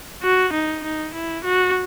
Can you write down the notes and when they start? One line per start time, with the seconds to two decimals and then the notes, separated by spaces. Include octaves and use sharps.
0.22 F#4
0.53 D#4
0.84 D#4
1.14 E4
1.44 F#4